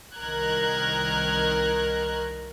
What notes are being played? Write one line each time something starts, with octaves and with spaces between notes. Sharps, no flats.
C2 D#3 A#4 A#5 F#6 G#6